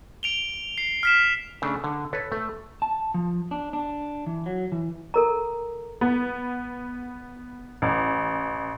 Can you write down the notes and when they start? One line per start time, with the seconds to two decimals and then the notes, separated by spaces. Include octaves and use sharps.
0.23 D7 F7 G7
0.78 C7
1.03 F6 B6 E7
1.62 C#3 A3 D4
1.84 D3
2.13 A4 B4 C#5
2.32 A3
2.82 A5
3.14 F3
3.51 D4
3.73 D4
4.26 E3
4.46 F#3
4.72 E3
5.14 A4 A#4 A#5
6.01 B3
7.82 A1